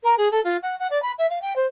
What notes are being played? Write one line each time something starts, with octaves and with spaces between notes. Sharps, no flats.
A#4
G#4
A4
F4
F#5
F#5
D5
B5
E5
F5
G5
C5